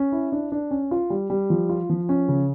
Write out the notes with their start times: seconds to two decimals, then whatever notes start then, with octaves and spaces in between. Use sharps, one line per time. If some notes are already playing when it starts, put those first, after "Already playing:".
Already playing: C#4
0.12 E4
0.32 D4
0.52 D4
0.71 C#4
0.91 F4
1.10 G3
1.30 G3
1.50 F3
1.69 F4
1.90 F3
2.09 C#4
2.28 C#3